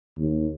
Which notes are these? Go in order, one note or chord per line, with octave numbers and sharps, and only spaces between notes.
D#2